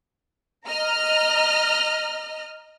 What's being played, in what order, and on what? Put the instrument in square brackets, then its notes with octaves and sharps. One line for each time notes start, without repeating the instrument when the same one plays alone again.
[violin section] D#5 A#5 F6